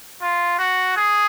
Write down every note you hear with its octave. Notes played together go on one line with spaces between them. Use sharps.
F4
F#4
G#4